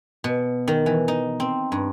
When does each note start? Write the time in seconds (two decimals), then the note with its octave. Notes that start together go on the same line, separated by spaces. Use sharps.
0.24 B2
0.68 D#3
0.86 E3
1.08 D#4
1.40 C4
1.72 G2